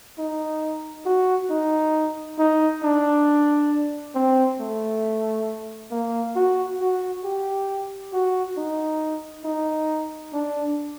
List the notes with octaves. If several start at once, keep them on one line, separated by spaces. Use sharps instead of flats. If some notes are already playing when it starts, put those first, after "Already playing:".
D#4
F#4
D#4
D#4
D4
C4
A3
A#3
F#4
F#4
G4
F#4
D#4
D#4
D4